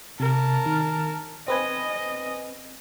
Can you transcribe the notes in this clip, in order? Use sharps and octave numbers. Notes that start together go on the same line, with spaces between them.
C3 A#4 A5
D#3
C4 B4 D#5 G#5